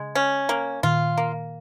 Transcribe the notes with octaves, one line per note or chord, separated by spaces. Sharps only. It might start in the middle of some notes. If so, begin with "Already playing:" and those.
Already playing: C#3 G#3
C#4
A#3
A#2 D#3 F4
A#3